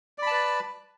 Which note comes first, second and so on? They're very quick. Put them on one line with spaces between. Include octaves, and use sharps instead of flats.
D5 B5 A5 B4